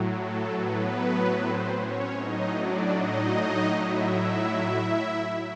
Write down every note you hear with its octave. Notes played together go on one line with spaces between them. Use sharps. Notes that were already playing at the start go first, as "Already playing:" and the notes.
Already playing: A2 F#3
A4
B3 B4
C4 C5
C#4 C#5
A2 F#3 D#4 D#5
D4 D5
D#4 D#5
E4 E5